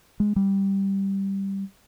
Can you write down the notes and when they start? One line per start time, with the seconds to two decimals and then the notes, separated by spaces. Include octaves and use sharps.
0.20 G#3
0.36 G3